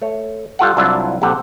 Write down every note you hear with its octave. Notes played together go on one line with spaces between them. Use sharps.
A3 C#5
G3 F4 A4 F#5
C2 F#3 D4 E4 F4 E5
A#1 C3 A4 F#5 G5